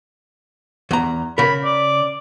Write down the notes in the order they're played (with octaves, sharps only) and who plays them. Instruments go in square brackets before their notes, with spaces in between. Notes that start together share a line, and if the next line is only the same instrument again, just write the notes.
[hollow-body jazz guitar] E2 A#5
[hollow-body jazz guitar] C#3 A#4 [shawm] B5
[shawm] D5